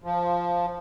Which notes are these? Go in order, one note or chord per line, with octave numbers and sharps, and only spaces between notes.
F3